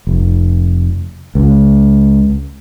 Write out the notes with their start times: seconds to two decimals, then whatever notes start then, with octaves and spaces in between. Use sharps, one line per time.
0.07 F1
1.35 C#2